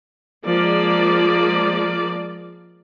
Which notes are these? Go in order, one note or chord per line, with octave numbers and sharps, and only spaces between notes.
F3 G#3 A#3 D5